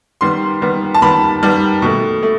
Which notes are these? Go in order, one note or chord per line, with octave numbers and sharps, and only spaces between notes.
D#3 G3 B3 C6
D#3 G3 B3
A5
D#3 G3 B3 B5
D#3 G3 B3
B2 A3
A3